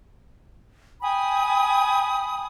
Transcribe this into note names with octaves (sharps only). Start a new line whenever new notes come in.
G5 G#5 B5 D#6